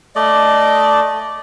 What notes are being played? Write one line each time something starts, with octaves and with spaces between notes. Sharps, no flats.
A3 D5 D#5